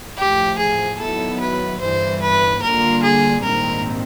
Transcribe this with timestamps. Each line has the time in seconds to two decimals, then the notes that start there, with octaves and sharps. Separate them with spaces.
0.17 A1 A2 F3 G4
0.58 G#4
0.99 D#3 F#3 B3 E4 A4
1.40 B4
1.80 G1 G2 E3 C5
2.21 B4
2.62 D3 G3 A#3 D4 F4 A#4
3.03 G#4
3.43 A#1 G#2 D#3 G3 C4 A#4